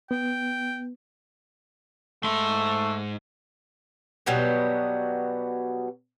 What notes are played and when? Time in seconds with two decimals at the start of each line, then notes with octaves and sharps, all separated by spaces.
0.11 B3 G5
2.24 G#2 A3 C6
4.26 B2 F#3 G3 B3